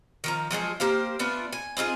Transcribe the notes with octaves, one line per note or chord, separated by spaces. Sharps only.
D#3 F3 A#5
F3 F#3 G#3 G#4
A#3 G4 C5 F5
A3 B3 D4 F4
G#5
C4 D#4 F4 G#4